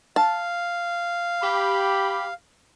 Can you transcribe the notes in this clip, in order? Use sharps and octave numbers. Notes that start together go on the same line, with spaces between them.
F5 A5
G4 B5